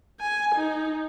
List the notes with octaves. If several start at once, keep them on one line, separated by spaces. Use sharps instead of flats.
G#5
D#4